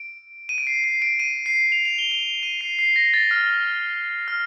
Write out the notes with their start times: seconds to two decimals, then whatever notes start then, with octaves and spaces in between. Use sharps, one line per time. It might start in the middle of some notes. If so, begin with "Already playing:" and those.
Already playing: D7
0.49 D#7
0.58 D7
0.67 C7
0.84 C7
1.02 D7
1.20 D#7
1.46 C7
1.72 F7
1.85 F7
1.98 G7
2.12 F7
2.43 D#7
2.61 C7
2.79 C7
2.96 A#6
3.14 A6
3.31 F6
4.28 F6